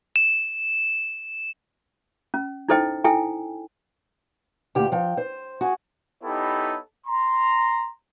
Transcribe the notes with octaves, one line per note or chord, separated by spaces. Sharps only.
E7
C#4
D#4 E4 A4 C5 D#5 G5
E4 A4 G5 G#5
D2 A#2 G4
F3 G5
C5
F#4 G#4
B3 D#4 E4 G4 A4 C#5
A#5 C6